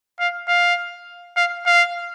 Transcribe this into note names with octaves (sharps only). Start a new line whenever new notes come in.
F5
F5
F5
F5